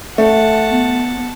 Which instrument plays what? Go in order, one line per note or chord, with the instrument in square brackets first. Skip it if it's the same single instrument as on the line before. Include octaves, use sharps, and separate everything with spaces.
[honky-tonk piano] A3 [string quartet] F#5 A5
[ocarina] B3